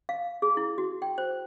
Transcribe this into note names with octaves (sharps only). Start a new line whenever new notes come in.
F5
G#4
E4
F#4
G5
C5